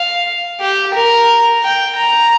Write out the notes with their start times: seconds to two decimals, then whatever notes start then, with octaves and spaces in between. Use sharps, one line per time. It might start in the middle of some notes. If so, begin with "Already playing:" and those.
Already playing: F5
0.61 G4
0.95 A#4
1.64 G5
1.97 A#5